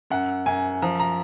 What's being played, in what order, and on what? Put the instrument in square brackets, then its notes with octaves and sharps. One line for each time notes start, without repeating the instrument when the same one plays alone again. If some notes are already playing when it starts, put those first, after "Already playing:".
[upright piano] F#2 F#5
F#2 G#5
F3 A#5
A#5